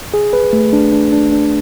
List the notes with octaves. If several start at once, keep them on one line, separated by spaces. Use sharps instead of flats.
G#4
B4
A3
D4
D4
D4
D4